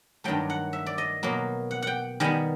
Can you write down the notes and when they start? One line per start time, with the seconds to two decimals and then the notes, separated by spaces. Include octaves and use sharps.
0.24 G2 D#3 F#3 A3 G5
0.50 F#5
0.73 E5
0.86 D5
0.98 D#5
1.23 B2 F#3 A#3
1.71 F#5
1.82 F#5 G5
2.20 D#3 G3 B3 G#5